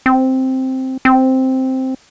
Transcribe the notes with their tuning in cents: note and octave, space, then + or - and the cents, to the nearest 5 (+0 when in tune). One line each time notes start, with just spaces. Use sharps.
C4 +0
C4 +0